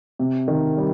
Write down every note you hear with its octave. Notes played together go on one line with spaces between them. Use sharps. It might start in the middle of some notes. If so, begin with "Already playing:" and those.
C3
D#3
G3